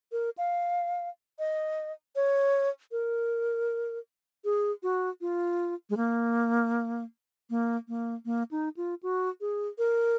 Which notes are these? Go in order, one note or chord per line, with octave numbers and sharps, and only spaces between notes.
A#4
F5
D#5
C#5
A#4
G#4
F#4
F4
G#3
A#3
A#3
A#3
A#3
D#4
F4
F#4
G#4
A#4